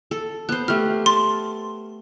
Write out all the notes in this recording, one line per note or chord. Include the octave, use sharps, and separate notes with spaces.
A4
B3 C5 F#6
A3 G4 F6
A5 C6